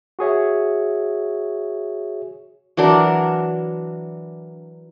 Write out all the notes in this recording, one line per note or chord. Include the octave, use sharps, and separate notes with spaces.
F#4 G#4 C#5 E5
E3 F#3 D4 A#4